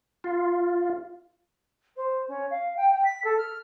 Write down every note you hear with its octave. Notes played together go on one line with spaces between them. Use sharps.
F4
C5
C#4
F5
G5
G5
B6
A4
F6